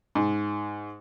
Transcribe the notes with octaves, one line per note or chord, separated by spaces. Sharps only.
G#2